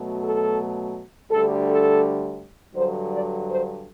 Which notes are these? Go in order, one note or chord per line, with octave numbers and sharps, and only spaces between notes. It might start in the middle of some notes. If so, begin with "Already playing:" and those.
Already playing: B2 F#3 A3
A4
D2 D3 G3 A4
A4
G2 D3 F#3 C5
D5
C5